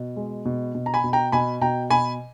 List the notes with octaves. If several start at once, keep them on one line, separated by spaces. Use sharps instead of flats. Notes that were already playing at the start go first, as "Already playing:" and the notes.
Already playing: B2
G#3
B2
B2
A#5
G#5 B5
B2
G5 A#5
B2 G#5 B5
B2 G5 A#5
B2 G#5 B5